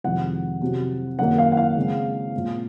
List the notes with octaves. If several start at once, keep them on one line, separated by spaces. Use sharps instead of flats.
F2 C3 D#3 G#3 F#5
C3 F#3 C4
F#2 D#3 A#3 F#5
F5
F#5
F5
C#3 G#3 C4
A#2 G#3 C4